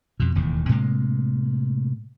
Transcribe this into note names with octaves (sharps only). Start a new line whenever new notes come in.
F2 B2
E1 D#2 A2
A2 C3 G#3 A#3